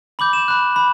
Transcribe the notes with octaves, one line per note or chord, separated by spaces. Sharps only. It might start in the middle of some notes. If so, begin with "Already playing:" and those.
B5 D6 G6 F#7
E7
B5 F#6
B5